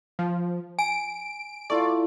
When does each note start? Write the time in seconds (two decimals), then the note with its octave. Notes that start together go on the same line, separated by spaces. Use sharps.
0.19 F3
0.79 G#5 D7
1.70 A3 E4 F4 D5